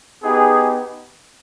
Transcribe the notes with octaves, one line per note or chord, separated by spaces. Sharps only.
B3 D#4 G4 G#4